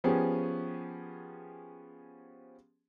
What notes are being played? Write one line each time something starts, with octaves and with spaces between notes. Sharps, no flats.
F3 B3 C#4 G4 G#4